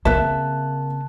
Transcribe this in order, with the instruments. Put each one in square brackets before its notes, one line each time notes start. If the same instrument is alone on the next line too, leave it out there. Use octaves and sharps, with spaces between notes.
[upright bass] C#3 C4 [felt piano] A#3 F#6 [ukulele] E5 [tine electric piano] A5